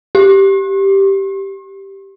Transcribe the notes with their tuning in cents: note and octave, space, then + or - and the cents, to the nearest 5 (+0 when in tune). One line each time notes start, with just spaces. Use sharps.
G4 -5